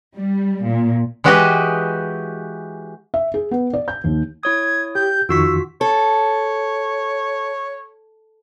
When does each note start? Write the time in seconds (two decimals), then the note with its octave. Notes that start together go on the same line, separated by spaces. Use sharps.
0.17 G3
0.67 A#2
1.24 E3 G#3 F#4 G4 B4 D#5
3.14 E5
3.34 G#4
3.51 B3
3.73 D5
3.88 G6
4.04 D#2
4.43 E4 C#5 D#6 G#6
4.95 G4 G6
5.29 F2 D#3 F4 F#4 C#6 E6 B6
5.81 A4 C#5